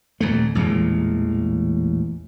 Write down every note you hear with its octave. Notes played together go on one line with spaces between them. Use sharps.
D#1 F2 A3
A1 E2 A#2 G#3